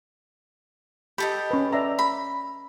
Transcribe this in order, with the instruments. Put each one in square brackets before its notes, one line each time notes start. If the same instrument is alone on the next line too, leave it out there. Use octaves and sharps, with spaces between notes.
[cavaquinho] G4 A4 D#5 [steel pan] B5
[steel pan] C#4 B4
D5 E5 A#5
[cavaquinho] B5